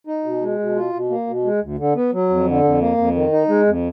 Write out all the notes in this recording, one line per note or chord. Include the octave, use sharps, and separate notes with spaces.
D#4
B2
G#3
B2
F4
B2
A#3
B2
G#3
D2
D3
B3
F#3
F2
D3
F2
A#3
F2
D#3
D#4
G#3
F2